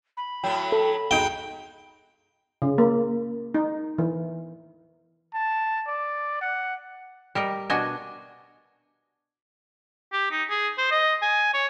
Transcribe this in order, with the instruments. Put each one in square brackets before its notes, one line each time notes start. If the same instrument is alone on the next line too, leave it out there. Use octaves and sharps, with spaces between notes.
[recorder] B5
[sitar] A2 F#3 [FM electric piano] G5
[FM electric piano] A4
[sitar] G#3 D#4 F#4 [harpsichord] G5
[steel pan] C#3
A#3
D#4
E3
[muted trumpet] A5
D5
F#5
[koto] G3 A#4 D#5
B2 D4 F#4 D#5 G#5
[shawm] G4
D#4
G#4
C5
D#5
G#5
C#5